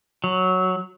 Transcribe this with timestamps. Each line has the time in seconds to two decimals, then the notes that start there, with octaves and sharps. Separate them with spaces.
0.24 F#3